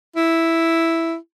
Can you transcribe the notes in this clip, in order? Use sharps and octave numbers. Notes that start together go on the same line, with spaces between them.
E4